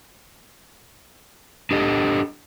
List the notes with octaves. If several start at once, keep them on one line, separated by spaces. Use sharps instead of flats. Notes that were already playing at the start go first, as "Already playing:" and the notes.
D4 G4 A4 D#5